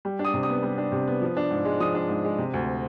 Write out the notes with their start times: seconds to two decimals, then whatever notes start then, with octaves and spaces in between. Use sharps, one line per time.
0.05 G3
0.19 D4
0.25 D#6
0.34 C3
0.43 D#6
0.49 B3
0.63 G3
0.78 D4
0.92 C3
1.07 B3
1.22 F3
1.37 D4
1.50 G#2
1.65 G#3
1.80 F3 D#6
1.95 D4
2.09 G#2
2.24 G#3
2.38 C3
2.54 D2